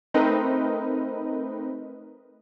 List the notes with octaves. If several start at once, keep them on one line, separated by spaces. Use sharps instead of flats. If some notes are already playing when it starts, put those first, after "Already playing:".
A3 C4 D#4 A#4 B4 D#5